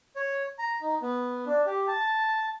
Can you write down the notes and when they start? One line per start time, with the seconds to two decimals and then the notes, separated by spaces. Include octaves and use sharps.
0.16 C#5
0.59 A#5
0.81 D#4
1.02 B3
1.46 D4
1.66 G4
1.88 A5